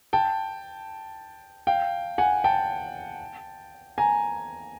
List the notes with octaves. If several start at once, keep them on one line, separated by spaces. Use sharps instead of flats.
G5 A5
F5 G5
F#5 G#5
G5 A5
G#5 A#5